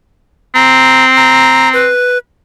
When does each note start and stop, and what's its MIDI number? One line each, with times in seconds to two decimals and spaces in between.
0.55 1.89 60
0.55 1.05 82
1.17 1.69 82
1.74 2.18 71